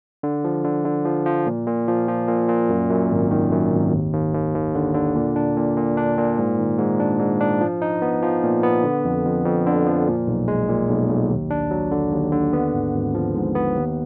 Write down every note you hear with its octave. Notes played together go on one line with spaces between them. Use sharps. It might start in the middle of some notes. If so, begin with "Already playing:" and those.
D3
F3
D3
D3
F3
F3
A#2
A#2
F3
F3
A#2
A#2
F#2
F#2
G#1
D#3
F#2
G#1
D#2
D#2
D#2
D#2
D3
D3
A#2
D4
A#2
A#2
D4
A#2
G#2
D#3
G#2
D4
G#2
D4
F3
D#4
B3
F3
A#2
B3
D3
F2
F2
F2
D3
F3
A#2
B1
G#3
A#2
B1
B1
D#2
D4
F#3
D3
D#2
D3
B3
G#1
G#1
F3
G#2
B3
D#2